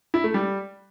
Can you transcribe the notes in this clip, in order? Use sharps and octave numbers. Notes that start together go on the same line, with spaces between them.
E4
A3
G3